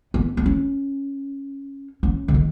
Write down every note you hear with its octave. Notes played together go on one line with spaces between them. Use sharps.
B3
B3
C#4
C#4
C#3
D#3